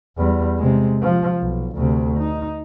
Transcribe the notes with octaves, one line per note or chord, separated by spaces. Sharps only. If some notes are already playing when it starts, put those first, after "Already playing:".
E2 G3
C3 G#3
F3
B1
D2 C3
D#4